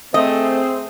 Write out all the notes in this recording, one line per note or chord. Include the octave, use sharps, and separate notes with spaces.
A3 C4 G#4 C5 D#5